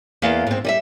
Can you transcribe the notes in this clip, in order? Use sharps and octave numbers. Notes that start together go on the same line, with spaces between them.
E2 A#3 F5
G#2 C4
G3 D#5 E5